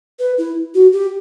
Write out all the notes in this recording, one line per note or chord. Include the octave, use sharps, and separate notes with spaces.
B4
E4
F#4
G4